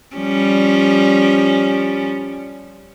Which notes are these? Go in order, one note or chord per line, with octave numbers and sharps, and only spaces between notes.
F3 G3 C#4